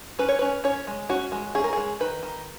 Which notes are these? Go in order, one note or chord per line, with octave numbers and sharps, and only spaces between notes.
C#4 B4
C#5
C#4 B4
C#4 C#5
G#3
C#4 F#4
G#3
C#4 G#4
A#4
G#3 G#4
D#3 B4
D#3